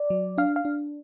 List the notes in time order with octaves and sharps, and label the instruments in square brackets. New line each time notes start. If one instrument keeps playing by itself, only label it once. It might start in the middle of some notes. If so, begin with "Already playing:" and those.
Already playing: [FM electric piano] D5
F#3
D4 F5
F5
D4